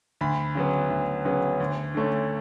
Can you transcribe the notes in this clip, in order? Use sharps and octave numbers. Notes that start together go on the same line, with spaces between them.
D2 B5
C#3 F#3 B3
D2
C#3 F#3 B3
D2
D3 A3 C#4